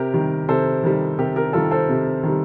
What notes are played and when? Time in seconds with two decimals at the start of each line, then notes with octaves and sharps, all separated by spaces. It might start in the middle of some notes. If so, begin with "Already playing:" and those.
Already playing: C3 G4 A#4
0.14 D#3 G3
0.49 C3 A4 C5
0.84 D#3 G3
1.18 C3 G4 A#4
1.36 G4 A#4
1.53 D#3 G3 F4 A4
1.71 A4 C5
1.89 C3
2.23 D#3 G3